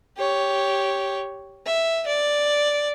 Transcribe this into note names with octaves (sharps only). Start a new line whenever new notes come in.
G4 C#5
E5
D5